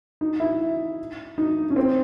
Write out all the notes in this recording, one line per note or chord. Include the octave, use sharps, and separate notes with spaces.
D#4
E4
D#4
C#4
C4